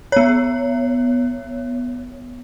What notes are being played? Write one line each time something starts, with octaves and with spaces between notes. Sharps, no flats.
B3 C#5